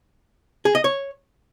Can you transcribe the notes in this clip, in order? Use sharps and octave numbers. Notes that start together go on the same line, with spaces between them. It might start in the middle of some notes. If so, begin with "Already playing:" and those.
G#4
D#5
C#5